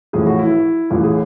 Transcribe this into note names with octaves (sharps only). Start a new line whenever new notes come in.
A1 A2 F3 G#4
F#4
E4
A1 A2 E3 F4
G#4